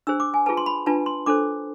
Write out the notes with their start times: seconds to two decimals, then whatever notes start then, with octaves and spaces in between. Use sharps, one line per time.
0.07 D4 G#4 C5 E6
0.20 D6
0.34 G#5
0.46 F4 G#4 B4 A5
0.57 C6
0.66 B5
0.86 D4 F4 B4 A5
1.06 C6
1.26 D4 A4 C5 D6